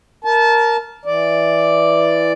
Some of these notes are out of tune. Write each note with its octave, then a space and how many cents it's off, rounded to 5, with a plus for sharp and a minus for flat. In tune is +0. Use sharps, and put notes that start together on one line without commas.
A#4 +0 A5 -20
E3 +0 D5 +0